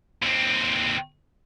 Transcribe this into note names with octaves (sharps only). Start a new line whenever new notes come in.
D#2 C4